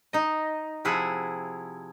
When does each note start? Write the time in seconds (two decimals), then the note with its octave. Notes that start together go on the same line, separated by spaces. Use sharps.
0.13 D#4 D#5
0.85 C3 F3 E4 G#4 F#5